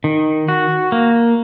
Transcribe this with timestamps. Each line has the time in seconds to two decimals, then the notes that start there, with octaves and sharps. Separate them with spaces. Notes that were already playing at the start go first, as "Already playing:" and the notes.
0.04 D#3
0.48 F#4
0.92 A#3